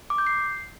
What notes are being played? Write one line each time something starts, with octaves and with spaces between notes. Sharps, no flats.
D6
G6
C7